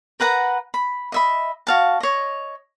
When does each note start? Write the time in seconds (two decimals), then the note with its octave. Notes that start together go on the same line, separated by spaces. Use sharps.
0.20 A#4 B4 F#5 A#5
0.74 B5
1.12 D#5 E5 B5
1.67 F#4 F5 A5
2.00 C#5 D#5